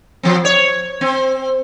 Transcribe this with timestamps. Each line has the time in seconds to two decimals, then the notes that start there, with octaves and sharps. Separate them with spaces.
0.23 F3 C4
0.45 C#5
1.01 C4